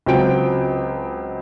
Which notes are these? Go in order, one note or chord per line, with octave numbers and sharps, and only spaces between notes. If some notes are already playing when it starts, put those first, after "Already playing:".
C#2 F#3 C4 F4 G5 D7